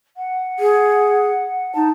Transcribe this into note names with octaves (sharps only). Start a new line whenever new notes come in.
F#5
G#4
D#4 A5